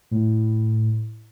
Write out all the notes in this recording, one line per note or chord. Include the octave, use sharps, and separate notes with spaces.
A2